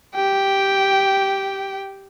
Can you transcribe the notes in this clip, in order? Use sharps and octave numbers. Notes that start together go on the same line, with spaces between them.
G4 G5